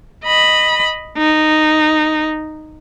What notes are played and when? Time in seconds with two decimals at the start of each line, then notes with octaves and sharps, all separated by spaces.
0.25 D#5 B5
1.18 D#4